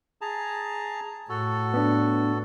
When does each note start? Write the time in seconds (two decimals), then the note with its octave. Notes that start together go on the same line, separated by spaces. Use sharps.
0.21 G#4 A5 A#5
1.29 A2 F#4 A4
1.74 B3 D4